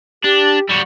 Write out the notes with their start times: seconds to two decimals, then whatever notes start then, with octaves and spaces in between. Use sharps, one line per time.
0.24 D4 G4
0.69 G3 F#4